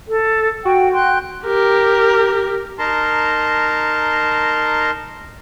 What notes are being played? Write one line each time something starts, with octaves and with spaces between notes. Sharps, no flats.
A4
F#4 G5
G5 C6 F#6
G4 A#4
D#4 A#4 A5 A#5 C6